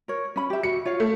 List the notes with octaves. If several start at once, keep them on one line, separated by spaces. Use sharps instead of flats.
A#4 C#5
C#4 B5
G4 E5
F#4 E5 C#7
F4 C#5 F5
A3